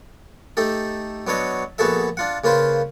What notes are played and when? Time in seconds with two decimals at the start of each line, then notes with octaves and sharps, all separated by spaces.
0.57 A3 D#4 G4 A4
1.27 F#3 B3 D4 C#5 D#5
1.78 A#1 B3 F#4 G#4 A4 E5
2.17 D4 F4 F#5
2.44 C#3 A#3 F4 B4 C5